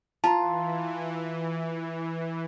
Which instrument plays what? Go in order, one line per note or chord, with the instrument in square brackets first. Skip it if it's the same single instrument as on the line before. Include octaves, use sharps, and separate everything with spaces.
[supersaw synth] E3 [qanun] F4 [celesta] A5 A#5